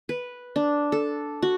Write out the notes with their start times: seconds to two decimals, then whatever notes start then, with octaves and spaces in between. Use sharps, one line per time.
0.09 B4
0.56 D4
0.92 A4
1.42 F#4